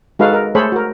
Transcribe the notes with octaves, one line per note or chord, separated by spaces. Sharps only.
G#3 D#4 F#4 A4 B4 F5
A#4
A3 G#4 A4 C5 C#5 B5
F#4 A#4